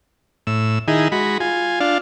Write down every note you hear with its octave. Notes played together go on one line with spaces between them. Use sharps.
A2 E6
D#3 D#4 E4 G#4
G#3 F#4 B5
F4 G#5
D4 F4 F5